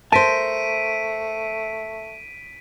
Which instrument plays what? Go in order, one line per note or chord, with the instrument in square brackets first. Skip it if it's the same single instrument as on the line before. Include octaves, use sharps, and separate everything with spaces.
[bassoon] A3 [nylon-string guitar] A#4 C5 [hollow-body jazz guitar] A5 [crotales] B6 D7 D#7